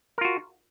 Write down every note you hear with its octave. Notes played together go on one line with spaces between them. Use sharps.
F4 F#4 A#4